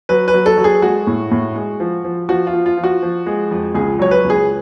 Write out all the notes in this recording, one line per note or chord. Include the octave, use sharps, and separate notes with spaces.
F#3 B4
B4
F#3
A4
F#3
G#4
G#3 F#4
A2
A2
G#3
F3
F3
F3 F#4
F4
F3
F4
F3
F#4
F3
G#3
F2
C#2 G#4
F#3 C#5
B4
C#2
G#4